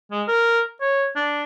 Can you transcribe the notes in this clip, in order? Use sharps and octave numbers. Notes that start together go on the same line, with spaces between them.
G#3
A#4
C#5
D4